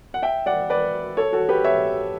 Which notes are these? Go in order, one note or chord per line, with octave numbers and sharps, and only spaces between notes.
F#5
E5 G5
D5 F#5
B4 D5
A4 C#5
F#4 A4
G4 B4
C#5 E5